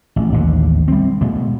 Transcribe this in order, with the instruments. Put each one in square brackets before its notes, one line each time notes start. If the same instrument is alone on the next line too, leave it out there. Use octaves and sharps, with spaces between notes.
[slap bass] A1
A1 D#2 D3
G3 C4
B2 G#3 A3